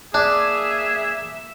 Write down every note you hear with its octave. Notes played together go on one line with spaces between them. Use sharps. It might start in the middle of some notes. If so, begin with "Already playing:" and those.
A#3 D4 G#4 E5